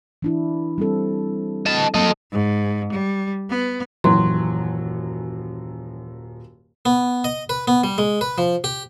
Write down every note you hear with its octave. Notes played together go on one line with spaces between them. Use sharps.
E3 D4 E4
G3 C4 A4
D#5 A5
F#3 A#3 D4 A4 D#5
G#2
G3
B3
D#1 F#2 E3 F#3 C6
B3
D#5
B4
B3
G3
G#3
B4
F3
G4